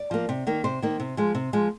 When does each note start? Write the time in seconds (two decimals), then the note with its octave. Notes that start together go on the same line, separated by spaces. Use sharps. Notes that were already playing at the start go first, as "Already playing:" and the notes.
Already playing: D5
0.11 F3 A#3
0.29 C3
0.47 D#3 A#3
0.64 C3 C5
0.82 D#3 A#3
1.00 C3
1.17 F3 G#3
1.35 C3
1.53 F3 G#3